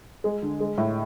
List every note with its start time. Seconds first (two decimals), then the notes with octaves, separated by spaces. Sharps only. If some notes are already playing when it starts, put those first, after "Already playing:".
0.24 G#3
0.42 D3
0.60 G#3
0.78 A2